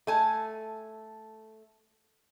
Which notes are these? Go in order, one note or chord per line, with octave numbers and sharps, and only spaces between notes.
A3 G#5 A5